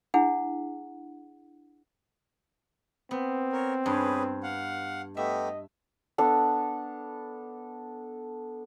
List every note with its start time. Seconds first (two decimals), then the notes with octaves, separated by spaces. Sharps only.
0.14 D4 E4 G#4 F#5
3.11 B3 C4
3.52 A#4 C#5
3.86 G2 C#4 G#4 B4
4.43 F5 F#5
5.17 A3 B3 G4 D#5 E5
6.18 B3 D4 A4